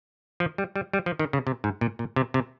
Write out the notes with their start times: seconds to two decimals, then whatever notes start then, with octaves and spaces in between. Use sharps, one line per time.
0.40 F3
0.58 G3
0.76 G3
0.93 G3
1.06 F3
1.19 D#3
1.33 C#3
1.47 C3
1.64 G#2
1.81 A#2
1.99 A#2
2.16 C3
2.34 C3